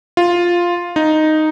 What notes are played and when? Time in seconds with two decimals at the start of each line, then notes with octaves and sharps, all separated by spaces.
0.17 F4
0.96 D#4